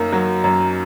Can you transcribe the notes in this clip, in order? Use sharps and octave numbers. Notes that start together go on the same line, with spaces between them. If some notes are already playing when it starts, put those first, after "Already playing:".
Already playing: F#2 A#3 D#4
F#3
F#2